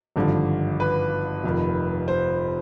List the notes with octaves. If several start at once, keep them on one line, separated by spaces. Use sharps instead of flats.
G#1 G2 D3 F3
B4
F1 F2 D#3
C5